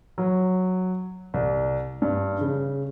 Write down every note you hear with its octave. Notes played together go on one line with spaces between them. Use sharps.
F#3
C2
G2
C#3